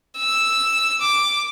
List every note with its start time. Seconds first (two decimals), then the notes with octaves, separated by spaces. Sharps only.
0.18 E6
1.01 D6